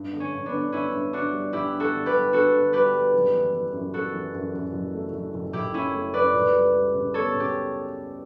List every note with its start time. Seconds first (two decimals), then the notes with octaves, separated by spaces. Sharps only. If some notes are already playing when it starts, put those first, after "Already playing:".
Already playing: G2
0.13 D3
0.20 C#4
0.33 G2
0.46 B3 D4
0.54 D3
0.72 G2 C#4 E4
0.92 G2
1.13 G2 D4 F#4
1.32 G3
1.53 G2 E4 G4
1.73 G2
1.80 F#4 A4
1.94 D3
2.06 G4 B4
2.14 G2
2.33 D3 F#4 A4
2.54 D3
2.73 G3 G4 B4
2.94 G3
3.14 F#1
3.34 E3
3.53 E3
3.73 F#2
3.93 F#2 F#4 A4
4.13 E3
4.34 F#2
4.54 F#2
4.73 F#1
4.94 A3
5.13 F#1
5.34 F#1
5.53 F#1 E4 G4
5.73 F#2 C#4 E4
5.94 A3
6.14 F#2 B4 D5
6.34 C#2
6.54 G3
6.74 G3
6.95 C#3
7.14 B3 A4 C#5
7.34 C#3
7.40 G4